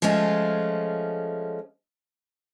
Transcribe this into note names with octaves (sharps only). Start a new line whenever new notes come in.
F3 G#3 A3 C#4 F4